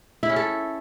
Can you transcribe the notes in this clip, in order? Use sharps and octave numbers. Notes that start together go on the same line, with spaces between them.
E4
C#4
A4